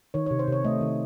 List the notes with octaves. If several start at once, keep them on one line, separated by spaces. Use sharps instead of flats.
D#3 C#5
C#5
C3
C5
C3 C#5
A3 D#5
D#3